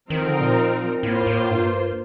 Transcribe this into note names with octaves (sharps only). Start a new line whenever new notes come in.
D#3 F3 C4 D#4 A#4
D3
A#2
A2 A#3 F4 C5
A2
G2